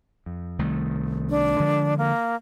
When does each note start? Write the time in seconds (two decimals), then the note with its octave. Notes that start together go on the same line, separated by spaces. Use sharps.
0.26 F2
0.59 C2 D#3 A3
1.29 D4
1.60 D3 F3 G#3
1.98 A#3